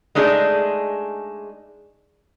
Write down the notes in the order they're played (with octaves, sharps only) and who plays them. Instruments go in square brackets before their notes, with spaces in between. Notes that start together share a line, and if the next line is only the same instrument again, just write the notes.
[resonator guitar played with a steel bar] G#3 A3 D4 D#4 G#4